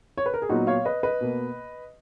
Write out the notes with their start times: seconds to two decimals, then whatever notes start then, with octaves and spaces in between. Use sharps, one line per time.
0.18 C#5
0.26 B4
0.34 A#4
0.42 G#4
0.49 A#2 F#3 B3 D#4 F#4
0.67 C#5 F5
0.85 B4 D#5
1.03 B4 D#5
1.21 B2 A#3